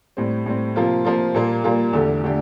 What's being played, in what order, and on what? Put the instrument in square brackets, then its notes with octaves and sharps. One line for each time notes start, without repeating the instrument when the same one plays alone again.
[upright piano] A2 G3 C4
A2 G3 C4
C3 F3 A#3 F4
C3 F3 A#3 F4
A#2 G3 A#3 F4
A#2 G3 A#3 F4
E2 D3 A3 D4 G4
D3 A3 D4 G4